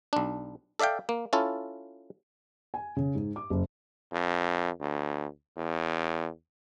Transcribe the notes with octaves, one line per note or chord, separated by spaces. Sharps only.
B1 D4
A4 D5 E5 F5 G5
A#3
C#4 E4 F4 A4
G#5
C#3
G#2
D6
F#1
F2
D2
E2